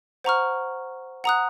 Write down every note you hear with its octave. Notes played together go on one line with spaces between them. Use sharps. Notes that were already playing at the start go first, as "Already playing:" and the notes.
C5 F#5 A#5 C#6 F6
F#5 A#5 D#6 F#6